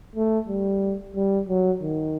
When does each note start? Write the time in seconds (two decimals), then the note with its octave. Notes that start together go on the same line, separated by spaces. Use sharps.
0.15 A3
0.48 G3
1.16 G3
1.49 F#3
1.82 D#3